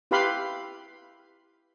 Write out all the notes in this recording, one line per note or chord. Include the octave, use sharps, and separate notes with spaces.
E4 G4 B4 F5 B5 C6